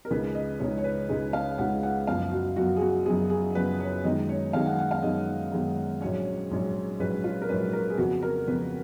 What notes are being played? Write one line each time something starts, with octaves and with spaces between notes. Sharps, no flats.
A#4
C#2 C#3 G#3 D#4 B4
D#5
C#2 C#3 G#3 D#4 C#5
C#5
B4
C#2 C#3 G#3 D#4 D#5
F5
C#2 C#3 G#3 D#4 F#5
F#5
F#1 F#2 F3 B3 F5
F#4
F#1 F#2 F3 B3 F#4
G#4
F#4
F#1 F#2 F3 B3 G#4
G#4
F#1 F#2 F3 B3 B4
C#5
F#2 D#3 G#3 B3 D#4 D#5
C#5
F#2 D#3 G#3 B3 D#4 F5
F#5
F#5
F5
F#2 D#3 G#3 B3 D#4 D#5
F#2 D#3 G#3 B3 D#4
A#1 G#2 F#3 C#4 C#5
A#1 G#2 F#3 C#4
A#1 G#2 F#3 C#4 B4
F4
A#4
A#1 G#2 F#3 C#4 B4
A#4
G#4
F2 C#3 F3 B3 F#4
A#4
F2 C#3 F3 B3 B4